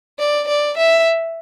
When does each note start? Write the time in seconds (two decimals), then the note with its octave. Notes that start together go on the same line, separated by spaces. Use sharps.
0.19 D5
0.48 D5
0.77 E5